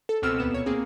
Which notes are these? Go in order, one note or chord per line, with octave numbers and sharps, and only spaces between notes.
A4
C#2 B2 C4 E6 F6
D#2 B3 E7
A#2 C#5
A#3 C4 G#4